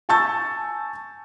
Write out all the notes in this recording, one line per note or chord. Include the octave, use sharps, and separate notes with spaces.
G#5 A5 C#6 E6 G6 A6